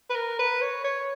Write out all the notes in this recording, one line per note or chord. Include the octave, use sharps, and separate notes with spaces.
B4
A#4
B4
C#5
C#5